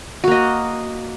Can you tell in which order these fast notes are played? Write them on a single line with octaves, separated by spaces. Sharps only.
F#4 A#3 D#5